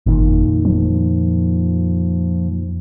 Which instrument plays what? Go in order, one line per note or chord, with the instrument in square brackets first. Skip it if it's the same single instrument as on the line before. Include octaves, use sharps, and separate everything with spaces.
[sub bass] G1 [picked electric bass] F2 A#2 D#3
[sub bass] F3